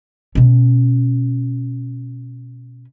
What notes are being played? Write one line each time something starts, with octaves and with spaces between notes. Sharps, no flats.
B2 C#4